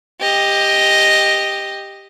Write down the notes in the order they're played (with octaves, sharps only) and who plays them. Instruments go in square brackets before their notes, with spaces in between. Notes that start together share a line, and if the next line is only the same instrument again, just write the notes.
[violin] G4 D#5